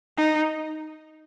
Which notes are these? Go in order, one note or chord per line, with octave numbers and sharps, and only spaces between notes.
D#4